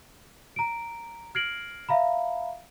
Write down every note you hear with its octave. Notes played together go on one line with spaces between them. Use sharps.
A#5 D7
F6 G#6 A#6 C7 D7 F#7
E5 F5 A#5 B5